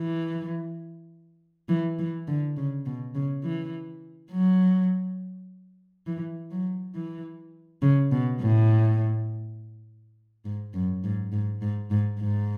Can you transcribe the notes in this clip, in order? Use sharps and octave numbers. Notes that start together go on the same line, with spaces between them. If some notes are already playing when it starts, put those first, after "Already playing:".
Already playing: E3
E3
E3
D3
C#3
B2
C#3
E3
F#3
E3
F#3
E3
C#3
B2
A2
G#2
F#2
G#2
G#2
G#2
G#2
G#2